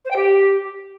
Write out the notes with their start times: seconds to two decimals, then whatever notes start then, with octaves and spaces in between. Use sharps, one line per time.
0.05 C5
0.10 G5
0.16 G4